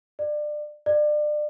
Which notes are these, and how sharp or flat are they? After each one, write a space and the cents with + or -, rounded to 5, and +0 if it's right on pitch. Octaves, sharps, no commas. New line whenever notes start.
D5 +25
D5 +30